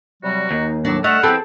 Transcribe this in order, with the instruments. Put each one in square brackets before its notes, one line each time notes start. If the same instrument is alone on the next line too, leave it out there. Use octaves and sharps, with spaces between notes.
[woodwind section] C3 F#3 G3 [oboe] F#4
[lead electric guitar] D#2 [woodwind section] D#4
[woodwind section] A2 F#3 [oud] D4 [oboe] F#4
[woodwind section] D3 E6 F6 [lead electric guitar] A3 [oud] D#5 [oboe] F#5
[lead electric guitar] E3 C4 [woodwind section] B3 G5 B5 [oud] G#4 A4